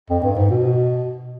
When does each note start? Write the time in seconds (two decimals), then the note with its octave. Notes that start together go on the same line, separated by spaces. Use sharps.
0.09 F2
0.23 G2
0.36 G#2
0.50 B2